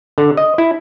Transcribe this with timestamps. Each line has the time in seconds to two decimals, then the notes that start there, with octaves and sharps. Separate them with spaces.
0.18 D3
0.37 D#5
0.58 E4